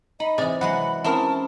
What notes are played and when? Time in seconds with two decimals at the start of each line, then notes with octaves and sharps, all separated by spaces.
0.20 D#4 D#5 B5
0.38 C3 E3 G#4 D5
0.61 E3 F#3 G#3 F#5 B5
1.04 C4 C#4 D#4 E4 A#4 A5